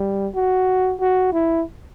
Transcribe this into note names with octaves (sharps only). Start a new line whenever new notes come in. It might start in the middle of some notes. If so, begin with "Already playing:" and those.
Already playing: G3
F#4
F#4
E4